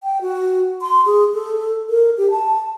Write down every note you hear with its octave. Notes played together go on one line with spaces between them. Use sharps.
G5
F#4
C6
G#4
A4
A#4
G4
A5